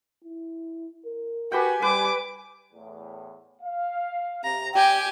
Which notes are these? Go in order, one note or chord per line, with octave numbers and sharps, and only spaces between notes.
E4
A#4
F#4 G4 B4 G5 G#5
G3 B4 D6
E2 A2
F5
C3 A#5
G4 D5 G5 G#5